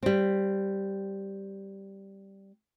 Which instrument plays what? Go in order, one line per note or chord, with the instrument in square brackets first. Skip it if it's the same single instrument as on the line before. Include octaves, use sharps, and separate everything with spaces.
[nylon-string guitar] G3 C4